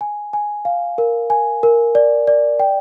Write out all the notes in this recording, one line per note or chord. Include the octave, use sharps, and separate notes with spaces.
G#5
G#5
F5
A#4
G#5
A#4
D5
D5
G5